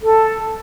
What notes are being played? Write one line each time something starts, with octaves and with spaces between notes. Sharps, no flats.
A4